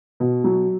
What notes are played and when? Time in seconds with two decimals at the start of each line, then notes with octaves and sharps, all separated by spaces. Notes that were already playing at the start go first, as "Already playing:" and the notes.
0.20 B2
0.44 F#3